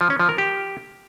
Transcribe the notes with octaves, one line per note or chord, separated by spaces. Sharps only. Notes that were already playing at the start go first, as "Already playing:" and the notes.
F3
C#4
F3
A#4
G4